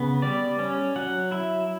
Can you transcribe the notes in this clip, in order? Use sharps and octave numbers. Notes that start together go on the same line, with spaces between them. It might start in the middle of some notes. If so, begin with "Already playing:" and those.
Already playing: C#3 B3
G3 D5
C#4
F#3 F#5
E4 E5